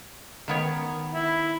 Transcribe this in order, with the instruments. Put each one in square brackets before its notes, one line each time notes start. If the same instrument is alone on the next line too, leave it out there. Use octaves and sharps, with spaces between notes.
[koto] D#3 B3 C#5
[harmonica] E4